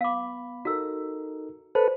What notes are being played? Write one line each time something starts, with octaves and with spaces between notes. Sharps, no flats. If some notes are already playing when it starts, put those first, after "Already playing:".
B3 F5 B5 D6
D#4 F#4 A4 A#4 E6
A4 B4 C5 D5